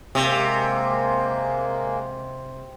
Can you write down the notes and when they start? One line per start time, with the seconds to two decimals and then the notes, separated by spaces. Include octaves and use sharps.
0.15 C3 G#3 A#3